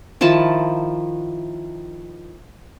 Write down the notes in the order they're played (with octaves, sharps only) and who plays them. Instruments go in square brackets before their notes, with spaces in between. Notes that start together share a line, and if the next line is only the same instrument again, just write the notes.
[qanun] D#3 F3 E4 A5